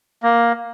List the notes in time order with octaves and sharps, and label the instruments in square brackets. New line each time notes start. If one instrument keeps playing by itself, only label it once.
[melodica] A#3